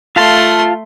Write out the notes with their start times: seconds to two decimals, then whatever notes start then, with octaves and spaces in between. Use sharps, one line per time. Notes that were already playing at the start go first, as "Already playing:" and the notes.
0.16 A3 F4 F5 A5 C6